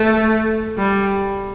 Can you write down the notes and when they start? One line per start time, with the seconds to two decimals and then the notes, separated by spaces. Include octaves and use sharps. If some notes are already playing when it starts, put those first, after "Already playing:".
Already playing: A3
0.78 G3